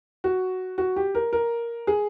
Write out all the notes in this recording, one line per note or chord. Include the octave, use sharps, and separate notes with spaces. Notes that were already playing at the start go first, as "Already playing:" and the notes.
F#4
F#4
G4
A#4
A#4
G#4